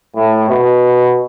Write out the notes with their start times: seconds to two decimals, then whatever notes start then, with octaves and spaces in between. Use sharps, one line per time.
0.16 A2
0.50 B2